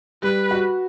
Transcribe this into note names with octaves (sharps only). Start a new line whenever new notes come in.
G3 B4
F#4